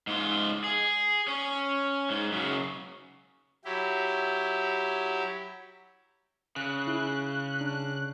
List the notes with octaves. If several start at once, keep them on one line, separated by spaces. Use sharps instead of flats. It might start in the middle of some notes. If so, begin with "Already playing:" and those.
G#2 F4
G#4
C#4
G#2
F#2 C#3
F#3 E4 G4
C#3 F#6
E4
D4 F#6